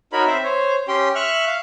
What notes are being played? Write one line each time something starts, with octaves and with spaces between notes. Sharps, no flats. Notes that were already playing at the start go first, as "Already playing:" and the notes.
D#4 F#4 A#4 C#5 B5
C4 C5 E5
C5 C#5
C#4 G4 G5 C6
E5 C#6 F6 F#6
F5